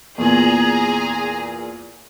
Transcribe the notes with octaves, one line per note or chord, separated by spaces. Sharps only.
E2 A#2 G#4 A#5